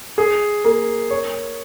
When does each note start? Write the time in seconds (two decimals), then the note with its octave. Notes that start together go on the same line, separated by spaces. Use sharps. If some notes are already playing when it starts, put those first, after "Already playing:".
0.18 G#4
0.65 A#3
1.10 C#5